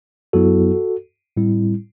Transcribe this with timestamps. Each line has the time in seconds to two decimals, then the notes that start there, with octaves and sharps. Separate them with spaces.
0.33 F#2 F#3 B3 E4 F#4 A4
1.37 A2 G3 C4 E4